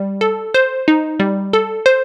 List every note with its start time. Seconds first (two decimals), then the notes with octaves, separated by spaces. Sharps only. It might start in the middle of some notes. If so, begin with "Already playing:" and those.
Already playing: G3
0.21 A4
0.54 C5
0.88 D#4
1.20 G3
1.53 A4
1.86 C5